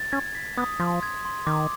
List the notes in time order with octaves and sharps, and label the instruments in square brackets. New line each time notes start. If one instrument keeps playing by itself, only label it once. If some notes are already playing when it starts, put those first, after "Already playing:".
Already playing: [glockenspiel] A6
[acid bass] C#4 [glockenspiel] G#6
[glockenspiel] B6
[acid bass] B3 [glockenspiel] D#6
[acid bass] F3 [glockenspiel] C6
[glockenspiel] G#6
C6
[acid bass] D#3 [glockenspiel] D6